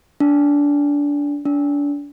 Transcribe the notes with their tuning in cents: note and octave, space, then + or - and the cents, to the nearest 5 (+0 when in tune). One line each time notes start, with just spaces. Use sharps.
D4 -20
D4 -30